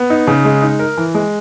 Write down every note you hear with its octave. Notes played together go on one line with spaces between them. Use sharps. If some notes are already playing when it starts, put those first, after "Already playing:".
Already playing: B3
D#4
C#3
G#3
D#4
A#4
E3
G#3